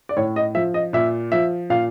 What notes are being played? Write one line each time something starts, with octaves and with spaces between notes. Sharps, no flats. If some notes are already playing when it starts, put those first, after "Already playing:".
D5
A2 C#5
D#5
F3 E5
D#5
A#2 E5
F3 E5
A#2 F5